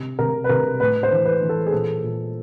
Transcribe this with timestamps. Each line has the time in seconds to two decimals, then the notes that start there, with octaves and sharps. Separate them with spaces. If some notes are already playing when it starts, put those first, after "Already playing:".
Already playing: C3
0.19 C3 A#4
0.44 B4
0.49 C3 A#4
0.80 A2 B4
1.03 C5
1.11 E3
1.25 B4
1.41 E3
1.49 A4
1.66 G#4
1.72 A#2 A4
2.03 A#2